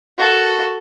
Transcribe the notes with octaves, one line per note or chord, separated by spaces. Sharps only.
F#4 A4